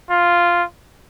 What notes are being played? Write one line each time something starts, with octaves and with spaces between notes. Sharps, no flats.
F4